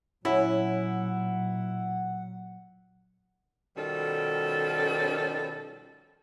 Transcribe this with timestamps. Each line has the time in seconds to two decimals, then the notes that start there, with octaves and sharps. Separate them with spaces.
0.25 A#2 F#3 C#4 E4 F#5
3.77 B2 D#3 F3 G3 C#4 A4